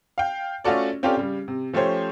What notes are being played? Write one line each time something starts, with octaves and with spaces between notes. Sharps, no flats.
F5 G5
A3 C#4 F4 F#4 A4 D5
C4 C#4 F4 G4 A4 D5
C#3 G3
C3
F3 A3 C#4 G4 C5 C#5